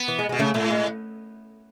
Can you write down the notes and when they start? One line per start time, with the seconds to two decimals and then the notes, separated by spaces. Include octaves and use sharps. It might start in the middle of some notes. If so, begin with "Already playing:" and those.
Already playing: B3
0.08 E3
0.19 G#3
0.29 B2 G#3
0.39 C#3 A3
0.54 A2 A3
0.70 G#3